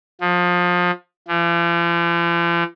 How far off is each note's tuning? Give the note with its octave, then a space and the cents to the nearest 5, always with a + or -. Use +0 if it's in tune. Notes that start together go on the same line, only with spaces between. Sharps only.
F3 +25
F3 -45